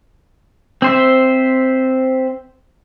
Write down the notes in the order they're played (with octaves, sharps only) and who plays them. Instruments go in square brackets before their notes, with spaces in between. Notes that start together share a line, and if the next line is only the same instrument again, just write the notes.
[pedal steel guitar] C4 C5 E5